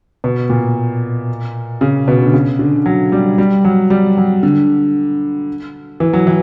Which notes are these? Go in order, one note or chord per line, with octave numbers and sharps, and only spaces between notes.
B2
A#2
C#3
B2
D3
C#3
D3
F#3
G3
G3
F#3
G3
F#3
D3
E3
F#3
E3